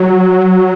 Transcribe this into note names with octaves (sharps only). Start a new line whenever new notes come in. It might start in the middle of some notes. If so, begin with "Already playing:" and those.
Already playing: F#3